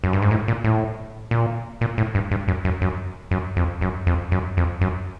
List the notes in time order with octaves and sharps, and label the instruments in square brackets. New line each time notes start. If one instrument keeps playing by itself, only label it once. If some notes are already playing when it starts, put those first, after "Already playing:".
[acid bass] F#2
G2
G#2
A2
A#2
A2
A#2
A#2
A2
G2
G2
F#2
F#2
F#2
F#2
F2
F#2
F2
F#2
F2
F#2